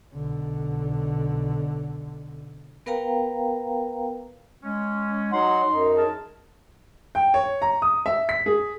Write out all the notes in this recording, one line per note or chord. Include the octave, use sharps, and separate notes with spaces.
B1 D3
B3 A#4 B4 F5 G5 A#5
G#3 C#4
F#3 D#4 F#5 C6
F#2 D#4
G#4 A#4 A5
G5
C#5
A#5
D#6
E5
B6
G#4